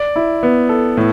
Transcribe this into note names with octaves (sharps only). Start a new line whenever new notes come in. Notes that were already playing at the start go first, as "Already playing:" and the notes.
Already playing: D5
E4
B3
A4
A2